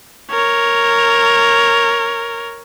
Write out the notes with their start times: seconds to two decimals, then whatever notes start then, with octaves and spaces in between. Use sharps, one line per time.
0.31 A#4 C#5